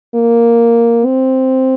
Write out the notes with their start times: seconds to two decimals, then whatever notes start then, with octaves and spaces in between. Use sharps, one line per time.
0.15 A#3
1.06 C4